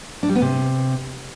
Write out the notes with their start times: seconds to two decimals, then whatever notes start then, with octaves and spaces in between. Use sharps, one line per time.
0.23 D4
0.29 G3
0.35 B3
0.42 C3